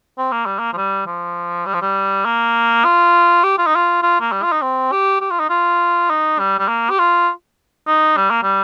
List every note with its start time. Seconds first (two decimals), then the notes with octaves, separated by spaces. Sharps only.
0.18 C4
0.32 A#3
0.46 G3
0.59 A#3
0.73 F3
0.77 G3
1.07 F3
1.66 G3
1.74 F3
1.82 G3
2.25 A#3
2.84 F4
3.44 G4
3.58 F4
3.67 D#4
3.76 F4
4.03 F4
4.21 A#3
4.32 G3
4.43 F4
4.52 D#4
4.62 C4
4.92 G4
5.21 G4
5.31 F4
5.40 D#4
5.50 F4
6.10 D#4
6.39 G3
6.59 G3
6.68 A#3
6.90 G4
6.99 F4
7.87 D#4
8.17 G3
8.31 A#3
8.43 G3